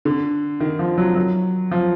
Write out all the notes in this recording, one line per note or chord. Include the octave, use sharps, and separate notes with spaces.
D3
D#3
F3
F#3
F#3
F3